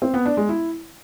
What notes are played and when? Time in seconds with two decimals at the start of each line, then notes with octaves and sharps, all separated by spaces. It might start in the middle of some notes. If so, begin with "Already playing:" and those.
0.02 C4
0.14 B3
0.25 D4
0.37 G#3
0.49 E4